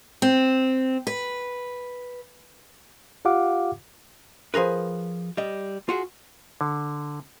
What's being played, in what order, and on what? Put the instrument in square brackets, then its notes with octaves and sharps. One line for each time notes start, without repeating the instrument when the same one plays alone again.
[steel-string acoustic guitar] C4
B4
[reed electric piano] F4 G4 F5 F#5 D6
[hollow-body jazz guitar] F3 G#4 A#4 B4
G3 D#5
F4 F#4 G#4
[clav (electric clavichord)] D3